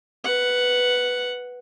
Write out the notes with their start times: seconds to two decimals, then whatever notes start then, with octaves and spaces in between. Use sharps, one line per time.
0.24 B4 F#5